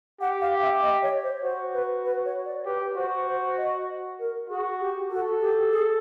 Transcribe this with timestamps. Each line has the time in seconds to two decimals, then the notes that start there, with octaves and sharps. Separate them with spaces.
0.21 G4 F#5
0.41 F5
0.62 E5
0.82 D#5
1.03 C#5
1.23 C5
1.43 F#4 C5
1.74 B4
2.05 B4
2.25 C#5
2.45 D5
2.65 G4 B4
2.96 F#4 C5
3.27 C5
3.58 D#5
4.19 A#4
4.50 F#4 G#4
4.80 G4
5.11 F#4 A4
5.41 G4
5.72 G#4